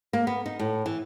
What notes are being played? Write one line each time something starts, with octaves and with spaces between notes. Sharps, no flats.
A#3
B3
D#4
A2
E3